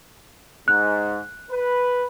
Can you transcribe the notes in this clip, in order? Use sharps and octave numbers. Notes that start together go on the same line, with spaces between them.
G#2 F#6
B4